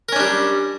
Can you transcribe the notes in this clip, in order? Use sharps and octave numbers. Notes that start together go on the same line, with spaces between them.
G3 C#4 D4 A#4